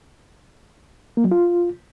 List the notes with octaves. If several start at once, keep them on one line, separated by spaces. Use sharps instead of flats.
A#3
F#3
F4